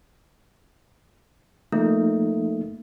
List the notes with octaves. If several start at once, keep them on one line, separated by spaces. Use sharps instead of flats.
F3 A3 A#3 D#4